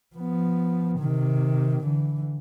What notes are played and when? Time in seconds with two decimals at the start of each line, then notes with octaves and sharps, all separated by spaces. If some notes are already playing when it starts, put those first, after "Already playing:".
0.15 F3 B3
0.98 C3 D#3
1.84 D3 E3